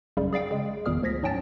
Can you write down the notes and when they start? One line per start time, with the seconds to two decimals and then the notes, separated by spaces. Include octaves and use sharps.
0.17 B1 F#2 C#3 G3
0.33 G#4 D5 F5 G5
0.51 C#3 G#3
0.86 G#1 E2 A#2 G3 G#4 F6
1.03 D2 F3 G#6 A#6 B6
1.23 G#2 F#3 C#4 G5 A5 A6